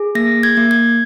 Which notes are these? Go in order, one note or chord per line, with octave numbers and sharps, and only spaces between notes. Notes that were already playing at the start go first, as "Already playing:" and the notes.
Already playing: G#4
A#3 A#6
G#6
A#3
G#6